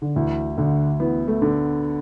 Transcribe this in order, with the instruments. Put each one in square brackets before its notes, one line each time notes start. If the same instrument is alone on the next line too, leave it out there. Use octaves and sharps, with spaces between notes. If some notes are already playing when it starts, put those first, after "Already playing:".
[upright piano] D3
[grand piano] D2 [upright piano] E3
[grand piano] D2 [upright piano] D3
[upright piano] E3 [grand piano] B3
[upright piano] A3
[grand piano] D3